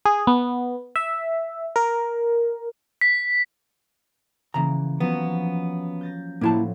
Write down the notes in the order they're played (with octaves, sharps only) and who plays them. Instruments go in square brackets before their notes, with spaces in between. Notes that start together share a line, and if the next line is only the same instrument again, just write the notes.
[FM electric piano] G#4
B3
E5
A#4
[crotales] B6
[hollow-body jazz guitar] C#3 A#5 [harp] E3 A#3
[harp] F3 F#3 C#4 [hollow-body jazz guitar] B3
[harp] G6 A6 A#6
[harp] A2 F3 F#3 [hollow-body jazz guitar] A#3 E4 A5